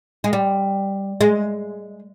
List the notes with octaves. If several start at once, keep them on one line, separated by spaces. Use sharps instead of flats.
G#3
G3
G#3